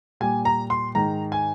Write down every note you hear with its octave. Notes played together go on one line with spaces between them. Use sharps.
A#2 G3 G#5
A#5
C6
G#2 D#3 G#3 A#5
G#5